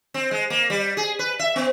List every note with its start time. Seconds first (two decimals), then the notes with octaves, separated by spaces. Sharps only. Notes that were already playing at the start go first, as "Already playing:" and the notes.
0.14 C4
0.31 G#3
0.50 A#3
0.70 G3
0.97 G#4
1.19 B4
1.39 E5
1.56 B3